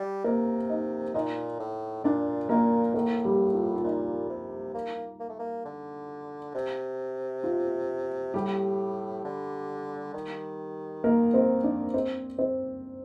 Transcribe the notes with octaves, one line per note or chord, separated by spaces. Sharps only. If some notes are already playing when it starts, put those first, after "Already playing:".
Already playing: G3
C3 A#3 A#4
D#4 D#5
A#2 D#4 D#5
A2
A#2 D4 D5
A#2 A#3 A#4
A2 A#3 A#4
G3 G4
F4
F4
A#2 D#4
C3
A#3
A#3
A3
A#3
D3
C3
F4
A2 G3 G4
D3
D#3
A#3 A#4
C4 C5
D4 D5
C4 C5
C4 C5